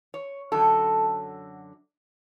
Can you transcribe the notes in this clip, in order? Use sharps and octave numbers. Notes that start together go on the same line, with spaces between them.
C#5
F#2 D3 F#3 A4